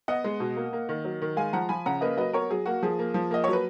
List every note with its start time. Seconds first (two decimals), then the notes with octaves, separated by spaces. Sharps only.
0.08 B3 D#5 F#5
0.24 G#3
0.40 B2
0.57 A#3
0.73 A#3
0.89 D#3
1.04 F#3
1.22 D#3
1.37 G#3 F5 G#5
1.53 F3 F#5 A#5
1.69 F3 G#5 B5
1.86 C#3 F#5 A#5
2.01 A#3 B4 D#5
2.17 F#3 B4 D#5
2.33 B3 A#4 C#5
2.50 F#3 G#4
2.66 A#3 F#4
2.82 F3 G#4
2.99 A#3
3.14 F3
3.31 A#3 D#5
3.44 F#3 C#5
3.53 B4